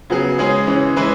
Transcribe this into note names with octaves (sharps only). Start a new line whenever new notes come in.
C#3 F#3 B3 G#4
C#3 G#3 C#4 G#4
C#3 E3 C#4
E3 G#3 E4 B4